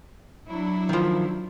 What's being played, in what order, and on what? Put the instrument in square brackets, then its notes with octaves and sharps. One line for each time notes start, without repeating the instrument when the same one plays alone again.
[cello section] F#3 D4 E4
[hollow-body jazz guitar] D#3 F3